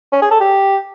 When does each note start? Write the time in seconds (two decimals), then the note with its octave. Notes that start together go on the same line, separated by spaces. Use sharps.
0.12 C#4
0.22 G#4
0.31 A4
0.40 G4